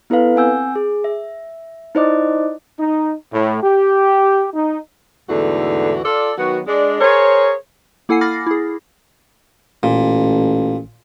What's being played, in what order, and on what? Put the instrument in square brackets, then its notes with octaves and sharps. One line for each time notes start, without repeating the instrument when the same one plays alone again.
[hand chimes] B3 E4 A4 B4 F5
C4 F#5 G#5 E6 G6
G#4
E5
D#4 E4 C5 D5 D#5 D6
[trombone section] D#4
A2
G4
D#4
[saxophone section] E2 G#2 D3 E3 A3 F#4
F4 A4 D5
D#3 F#3 B3 F#4
G#3 D4
G#4 A#4 C5 C#5
[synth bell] A#3 E4 A4 F#5 G#5 C7
B5 D6 F6 A6 A#6 C7
E4 G#4
[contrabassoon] A1 [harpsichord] A#2